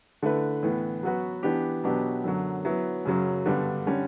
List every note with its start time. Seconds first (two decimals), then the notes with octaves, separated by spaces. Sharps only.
0.22 D3 A3 E4 B4
0.63 A2 E3 B3
1.03 F#3 B3 F#4 B4
1.43 E3 B3 D4 G4
1.84 B2 F#3 B3 D4 G4
2.24 F#2 D3 F#3
2.65 F#3 B3 E4
3.05 F#2 C#3 F#3
3.46 G2 D3 G3 B3 D4
3.87 D3 G3 C#4